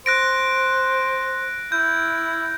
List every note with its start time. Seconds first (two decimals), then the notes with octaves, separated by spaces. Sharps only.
0.06 C5 F#6 A#6 D7
1.72 E4 G6